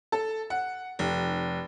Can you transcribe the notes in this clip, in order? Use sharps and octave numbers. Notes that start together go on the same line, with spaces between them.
A4
F#5
F1